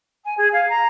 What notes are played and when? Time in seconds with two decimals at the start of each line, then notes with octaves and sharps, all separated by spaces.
0.24 G#5
0.37 G#4
0.52 F5
0.69 A#5